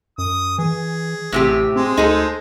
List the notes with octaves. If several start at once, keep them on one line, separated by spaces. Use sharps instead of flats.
F#2 D#6
E3 G#4
A1 A2 C3 G4
G#3 C4 C5
D2 D#4 G#4 A4